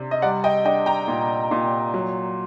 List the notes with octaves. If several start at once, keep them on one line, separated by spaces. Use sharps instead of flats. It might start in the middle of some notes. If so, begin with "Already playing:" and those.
Already playing: C3 D4
D#5
G3 D5 F#5
D#5 G5
D4 D#5 G5
G5 A#5
A#2
A#2
F#3